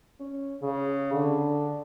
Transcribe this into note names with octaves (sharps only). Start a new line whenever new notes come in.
C#4
C#3
D3